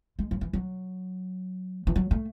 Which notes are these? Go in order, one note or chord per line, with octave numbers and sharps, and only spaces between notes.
G#3
F#3
E3
F#3
E3
F#3
A3